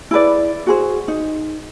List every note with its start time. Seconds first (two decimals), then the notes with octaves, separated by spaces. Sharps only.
0.11 E4 G#4 B4 D5
0.67 F#4 G#4 C5
1.08 D#4